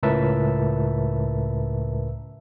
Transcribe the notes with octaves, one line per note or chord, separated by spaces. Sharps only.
C#2 A2 A#4 B4 E5 A5